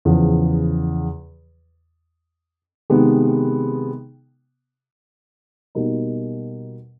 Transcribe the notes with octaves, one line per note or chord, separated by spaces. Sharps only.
E2 C#3 F3
C3 D#3 G#3 B3
B2 G3 A#3 D#4